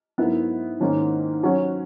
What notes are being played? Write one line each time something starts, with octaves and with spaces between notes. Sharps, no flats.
G#2 F#3 B3 E4 A#4
G#2 D#3 A#3 C#4
F#3 C#4 F#4